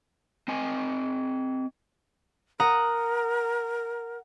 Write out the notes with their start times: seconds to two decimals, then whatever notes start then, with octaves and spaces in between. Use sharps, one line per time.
0.48 C4 D#5 G#5
2.60 A#4 F#5 A#5 D#6